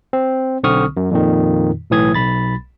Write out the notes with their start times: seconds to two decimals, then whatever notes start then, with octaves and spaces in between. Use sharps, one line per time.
0.13 C4
0.63 B1 D3 C4 C#6 D#6 F6
0.97 F#2
1.11 F2 A#2 D#3
1.91 B1 A2 E3 D#6 G#6
2.14 B1 B5 A6